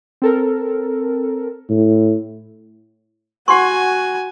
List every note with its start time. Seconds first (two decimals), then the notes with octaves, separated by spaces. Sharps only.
0.22 C4 A4 A#4
1.70 A2
3.48 F#4 F#5 G#5 C6 C#6